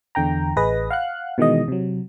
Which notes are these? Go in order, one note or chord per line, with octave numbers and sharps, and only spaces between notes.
E2 D3 G5 A#5
A1 G#4 B4 D#5 A#6
F5 F#5 F#6
B2 D#3 E3 G#3 D#5
C3 F#3